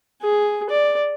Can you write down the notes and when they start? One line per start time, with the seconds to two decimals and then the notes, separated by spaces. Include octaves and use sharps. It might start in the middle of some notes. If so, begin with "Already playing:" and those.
0.22 G#4
0.69 D5